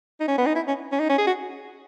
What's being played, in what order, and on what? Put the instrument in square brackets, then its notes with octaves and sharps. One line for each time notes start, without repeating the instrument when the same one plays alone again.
[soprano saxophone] D#4
C#4
B3
D#4
E4
C#4
C#4
D#4
C#4
G#4
F#4